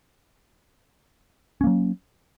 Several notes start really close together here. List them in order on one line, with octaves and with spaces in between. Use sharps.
C#4 A#3 F#3